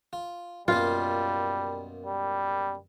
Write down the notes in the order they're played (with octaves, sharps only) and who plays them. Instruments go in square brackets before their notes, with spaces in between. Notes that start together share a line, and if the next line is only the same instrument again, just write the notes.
[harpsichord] F4
[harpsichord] F#2 B2 A#3 [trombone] G3 [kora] F4
[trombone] G3